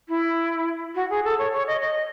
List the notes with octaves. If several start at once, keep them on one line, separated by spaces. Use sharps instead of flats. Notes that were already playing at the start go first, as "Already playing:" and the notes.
E4
F#4
G#4
A4
C#5
C#5
D#5
D#5